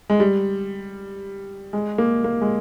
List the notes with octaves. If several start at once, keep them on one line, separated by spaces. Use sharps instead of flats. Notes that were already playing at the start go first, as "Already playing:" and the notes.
G#3
G3
G#3
A#3
A#3
G#3